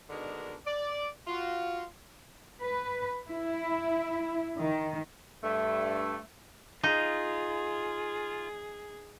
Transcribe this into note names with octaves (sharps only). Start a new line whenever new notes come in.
B2 D3 D#3 G#3 D4 A#4
D5
F4 F#4
B4
E4
D#3
G2 A3
D#4 F4 G#4